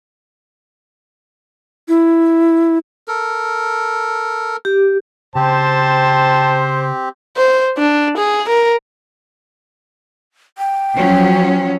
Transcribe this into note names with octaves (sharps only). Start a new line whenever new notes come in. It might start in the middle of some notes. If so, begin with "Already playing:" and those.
E4
A4 A#4
G4
C#3 C4 G4 C5 A5
C5
D4
G#4
A#4
G5
F3 F#3 C#4